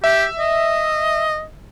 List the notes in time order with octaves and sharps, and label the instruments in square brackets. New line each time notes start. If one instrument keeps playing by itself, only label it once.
[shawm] G4 [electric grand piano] E5
[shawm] D#5